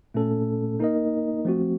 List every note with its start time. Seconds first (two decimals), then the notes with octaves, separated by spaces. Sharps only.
0.14 A#2 A3 C#4 A4
0.79 A#3 D#4 A#4 D#5
1.45 F3 A3 C4 F#4